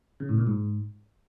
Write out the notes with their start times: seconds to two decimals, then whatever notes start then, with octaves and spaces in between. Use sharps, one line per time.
0.20 C#3
0.29 A2
0.38 A#2
0.47 G#2